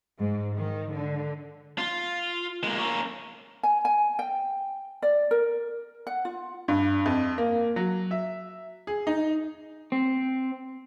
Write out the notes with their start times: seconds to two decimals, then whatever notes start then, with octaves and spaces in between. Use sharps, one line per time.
0.20 G#2
0.56 D#3
0.92 D3
1.78 F4
2.64 G#3 A#3
2.78 A#3 C#4
3.63 G#5
3.85 G#5
4.19 G5
5.02 D5
5.31 A#4
6.07 F#5
6.25 F4
6.68 G2
7.06 F2
7.38 A#3
7.76 F#3
8.11 E5
8.87 G#4
9.07 D#4
9.92 C4